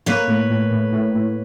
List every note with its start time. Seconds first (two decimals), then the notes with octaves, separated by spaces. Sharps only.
0.06 A#3 B4 C#5
0.28 A2
0.50 A2
0.71 A2
0.92 A2
1.14 A2